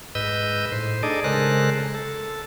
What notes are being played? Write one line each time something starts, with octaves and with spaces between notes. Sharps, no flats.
G#2 B4 D#5 E6 G6
A2 C5
D4 D#4 G#4 A4 D5 D#5
C#3 G#3 A4 A#4 C5 F#6
A4